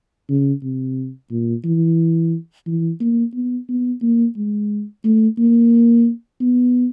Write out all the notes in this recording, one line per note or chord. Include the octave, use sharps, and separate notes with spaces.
C#3
C3
A#2
E3
E3
A#3
B3
B3
A#3
G#3
A3
A#3
B3